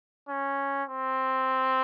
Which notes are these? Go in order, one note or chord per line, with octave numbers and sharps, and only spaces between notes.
C#4
C4